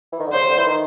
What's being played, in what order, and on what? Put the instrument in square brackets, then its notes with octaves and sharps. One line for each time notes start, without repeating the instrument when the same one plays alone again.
[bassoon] E3
D#3
D3
[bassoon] C#3 [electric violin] C5
[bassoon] C3
D3
E3
D#3